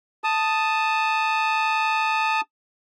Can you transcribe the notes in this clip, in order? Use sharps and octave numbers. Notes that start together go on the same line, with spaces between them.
A5 D#6